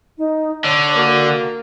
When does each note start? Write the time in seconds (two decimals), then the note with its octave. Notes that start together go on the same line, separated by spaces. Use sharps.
0.18 D#4
0.64 D3 C#5
0.95 A#3 F#4